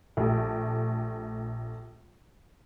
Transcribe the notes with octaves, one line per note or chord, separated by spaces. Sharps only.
A#1 A3 G4